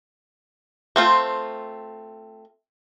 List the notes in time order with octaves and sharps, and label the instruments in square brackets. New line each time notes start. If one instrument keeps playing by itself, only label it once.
[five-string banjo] A3 C4 F4